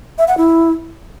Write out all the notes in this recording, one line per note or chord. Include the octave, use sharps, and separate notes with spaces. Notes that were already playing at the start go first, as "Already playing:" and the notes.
E5
F#5
E4